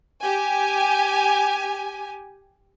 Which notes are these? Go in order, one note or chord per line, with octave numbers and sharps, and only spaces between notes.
G4 G#5